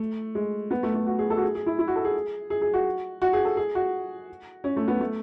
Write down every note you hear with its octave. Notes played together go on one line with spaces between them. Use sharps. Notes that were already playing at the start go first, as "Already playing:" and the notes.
Already playing: A3
G#3
B3
A3
A3
F#4
G#4
A4
F#4
G#4
G#4
E4
E4
F#4
A4
G#4
G#4
G#4
F#4
F#4
G#4
A4
G#4
F#4
C#4
A3
B3
A3